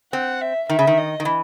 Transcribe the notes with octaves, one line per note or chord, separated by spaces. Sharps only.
C4 F#5
E5
D#3 E5
C#3
D#3
D#5
D#3
E3